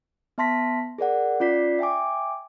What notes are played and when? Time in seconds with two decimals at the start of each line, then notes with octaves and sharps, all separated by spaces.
0.38 B3 E5 A5 C6 A#6 B6
0.98 G#4 A#4 D5 F#5
1.40 C#4 F4 D5 B6 C7
1.79 E5 G5 G#5 D6